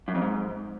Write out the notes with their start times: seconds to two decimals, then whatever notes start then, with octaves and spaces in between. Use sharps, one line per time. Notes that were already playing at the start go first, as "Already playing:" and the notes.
0.08 F#2
0.15 F2
0.22 G#2